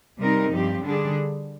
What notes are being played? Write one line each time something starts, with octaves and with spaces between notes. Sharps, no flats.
C3 G3 C4 D#4 A#4
G2 F3 C4 G4
D3 G3 D4 G#4